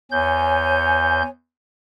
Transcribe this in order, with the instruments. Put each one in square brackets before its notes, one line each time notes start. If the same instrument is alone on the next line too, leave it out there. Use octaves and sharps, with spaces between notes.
[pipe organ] E2 G6 [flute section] C#5 G#5